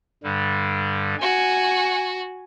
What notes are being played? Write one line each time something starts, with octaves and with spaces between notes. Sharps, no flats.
G2 D3 G3
F#4 F#5 G#5